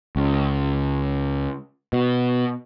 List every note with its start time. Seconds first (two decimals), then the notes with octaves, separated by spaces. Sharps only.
0.16 C#2
1.93 B2